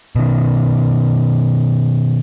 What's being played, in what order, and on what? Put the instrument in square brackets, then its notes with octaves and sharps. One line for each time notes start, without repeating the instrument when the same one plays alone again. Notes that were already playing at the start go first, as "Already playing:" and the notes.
[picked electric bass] B2 D#3